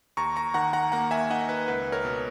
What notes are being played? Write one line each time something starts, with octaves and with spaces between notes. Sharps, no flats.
D#2 A#5 C#6
A#5 C#6
D#3 F#5 A#5
F#5 A#5
A#3 F#5 A#5
E5 G#5
D#4 D#5 F#5
B4
C#2 B4
A#4 C#5
B2